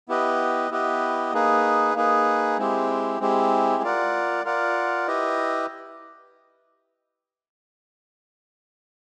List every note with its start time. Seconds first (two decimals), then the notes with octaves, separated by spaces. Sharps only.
0.09 B3 E4 G4 B4 D#5
0.71 B3 E4 G4 B4 D#5
1.33 A#3 D#4 G#4 B4
1.95 A#3 D#4 G#4 B4
2.58 G#3 C4 E4 G4
3.21 G#3 C4 E4 G4
3.83 F4 A#4 D5 F#5
4.45 F4 A#4 D5 F#5
5.07 E4 G4 B4 D#5